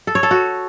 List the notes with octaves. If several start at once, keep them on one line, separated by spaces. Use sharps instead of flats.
A4
C#5
A4
F#4